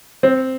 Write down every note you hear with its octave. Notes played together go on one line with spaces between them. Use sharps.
C4